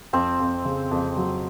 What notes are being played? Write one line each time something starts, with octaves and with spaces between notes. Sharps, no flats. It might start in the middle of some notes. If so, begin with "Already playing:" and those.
F2 C4
F2
C#3
F2
F#3